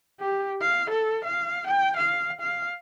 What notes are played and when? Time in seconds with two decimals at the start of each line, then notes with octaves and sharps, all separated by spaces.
0.20 G4
0.61 F5
0.90 A4
1.24 F5
1.67 G5
1.96 F5
2.41 F5